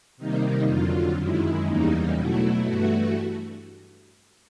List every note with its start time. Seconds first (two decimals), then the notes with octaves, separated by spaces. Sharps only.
0.17 C3 D#3 G3 A#3 D#4
0.66 F2 D3 F#3 F4
1.16 F#2 D#3 G#3 E4
1.66 E2 C#3 E3 G3 A#3 D#4
2.15 B2 F#3 A3 E4
2.65 G2 E3 A3 F#4